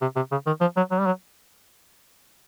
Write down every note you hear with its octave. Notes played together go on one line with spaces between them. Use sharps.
C3
C3
C#3
D#3
F3
F#3
F#3
G3
F#3